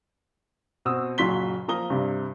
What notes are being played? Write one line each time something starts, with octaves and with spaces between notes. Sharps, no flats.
B2 C4 D#6 E6
F#1 A#2 F#3 C6 B6 G7
F3 A#3 A#5 D#6 G7
G2 C3